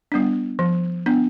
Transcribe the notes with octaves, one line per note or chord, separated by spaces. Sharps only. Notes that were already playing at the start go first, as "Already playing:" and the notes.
G3 B3 D4
F3
B3 D4